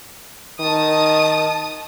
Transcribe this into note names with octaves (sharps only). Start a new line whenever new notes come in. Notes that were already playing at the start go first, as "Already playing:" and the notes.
D#3 A5 D#6